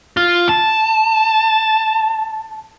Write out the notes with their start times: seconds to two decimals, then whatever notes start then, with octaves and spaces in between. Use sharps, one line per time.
0.17 F4
0.49 A5